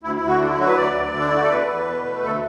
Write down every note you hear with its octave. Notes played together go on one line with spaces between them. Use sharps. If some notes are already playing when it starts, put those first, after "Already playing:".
D2 E4
E4
D2
F#4
D3 D4
E4
F#3 F#4
B4
D2 D5
D2
D3
D4
E4
A3 F#4
A4
E2 B4
E2
B2
A3
D2 A4